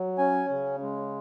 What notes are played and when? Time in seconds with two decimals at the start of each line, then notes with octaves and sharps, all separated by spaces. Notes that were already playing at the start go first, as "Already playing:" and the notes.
Already playing: F#3
0.18 C#4 G#5
0.50 C#3
0.82 G#3